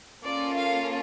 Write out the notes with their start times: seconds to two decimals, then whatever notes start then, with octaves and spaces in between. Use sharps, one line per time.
0.24 A#3 C#4 F4 A4 D5
0.56 F5